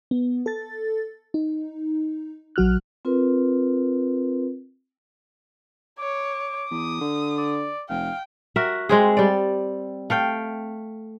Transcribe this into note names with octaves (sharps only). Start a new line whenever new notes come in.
B3
A4 A6
D#4
A#1 F#3 F#4 F6 F#6
C4 F4 A#4 B4
C#5 D6
E2 D#6
D3
D5
F1 F5 G5
F#4 A#4 E5
G#3 C4 G#4
G3 D5
A3 F5 G5